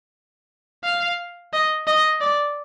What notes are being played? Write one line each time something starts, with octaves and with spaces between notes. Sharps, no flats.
F5
D#5
D#5
D5